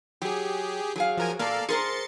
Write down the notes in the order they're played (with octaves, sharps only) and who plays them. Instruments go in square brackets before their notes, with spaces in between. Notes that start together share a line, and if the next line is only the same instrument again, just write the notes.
[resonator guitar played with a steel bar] F#3 [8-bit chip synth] G4 G#4
[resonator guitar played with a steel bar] F#3 G#4 F5
[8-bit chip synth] F3 A#4 G#5
[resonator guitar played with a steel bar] A#2 A#3 [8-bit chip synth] A4 D5 F5
[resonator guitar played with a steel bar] G#4 A#4 C5 [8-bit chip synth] C6 A6 C#7